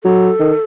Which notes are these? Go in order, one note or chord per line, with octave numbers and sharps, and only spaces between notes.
F#3 A4
D#3